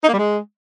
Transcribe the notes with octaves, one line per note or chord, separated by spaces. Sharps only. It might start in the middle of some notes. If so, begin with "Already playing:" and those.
D#4
A#3
G3
G#3